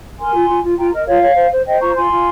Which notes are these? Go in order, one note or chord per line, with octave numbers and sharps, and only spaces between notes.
A#4 G#5 C6
F4
F4
F4
F4 G5 A#5
A#4 D#5
F4 C#5 F5
C#5
C5
C5
C5 D#5 G5
F4 A#5 C#6
F4 G#5 C6
F4